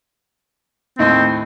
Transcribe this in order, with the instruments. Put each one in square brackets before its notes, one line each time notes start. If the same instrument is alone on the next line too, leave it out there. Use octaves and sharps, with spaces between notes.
[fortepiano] D#2 A2 D#5 [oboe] C4